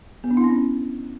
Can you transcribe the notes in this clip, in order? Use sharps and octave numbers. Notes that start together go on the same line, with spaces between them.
B3
D4
E4
C4
C#4